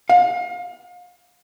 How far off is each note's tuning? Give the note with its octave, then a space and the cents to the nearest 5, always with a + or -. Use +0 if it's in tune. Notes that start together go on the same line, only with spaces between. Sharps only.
F5 +35